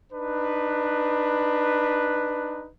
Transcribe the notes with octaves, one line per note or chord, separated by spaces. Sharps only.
D4 D#4 B4